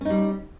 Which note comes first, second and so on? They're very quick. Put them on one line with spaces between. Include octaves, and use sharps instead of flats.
C#4 D#4 G3